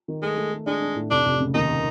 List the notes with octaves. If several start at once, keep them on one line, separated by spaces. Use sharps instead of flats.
D#3
G#3 A3
A3
A3
G#3 D4
D4
A2
F1 D4
F1
C#3
D#2 D#4